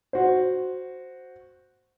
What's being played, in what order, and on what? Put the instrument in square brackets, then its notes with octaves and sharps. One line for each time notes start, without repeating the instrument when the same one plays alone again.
[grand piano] F#4 C5